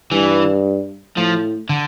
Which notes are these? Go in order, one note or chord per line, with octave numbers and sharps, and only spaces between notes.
G2 E3
A2 F3
D3